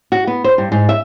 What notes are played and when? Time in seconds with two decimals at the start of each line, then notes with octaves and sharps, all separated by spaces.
0.12 F#4
0.27 B3
0.44 C5
0.58 G2
0.72 G#2
0.89 E5